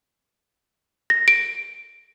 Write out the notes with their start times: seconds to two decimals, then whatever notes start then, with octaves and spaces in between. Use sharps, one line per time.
1.10 A#6
1.28 D7